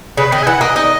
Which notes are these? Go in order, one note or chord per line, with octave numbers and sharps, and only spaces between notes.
C#3 B4
D#3 D#5
G#5
E3 F#5
A#3 D#5
D#4 D#5